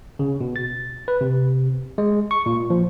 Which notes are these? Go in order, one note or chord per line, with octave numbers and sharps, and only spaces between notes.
C#3
B2
A6
B4
C3
G#3
C#6
A#2
F3